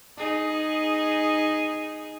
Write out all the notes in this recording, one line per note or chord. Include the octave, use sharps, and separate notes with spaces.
D#4 G#4